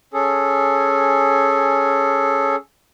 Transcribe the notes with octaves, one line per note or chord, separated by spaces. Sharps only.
C#4 G#4 A4